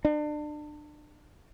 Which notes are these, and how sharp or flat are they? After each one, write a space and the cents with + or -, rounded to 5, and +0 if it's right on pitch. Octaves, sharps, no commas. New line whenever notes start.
D4 +30